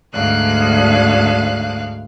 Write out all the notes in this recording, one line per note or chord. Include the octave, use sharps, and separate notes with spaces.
D2 G#2 F5 F#6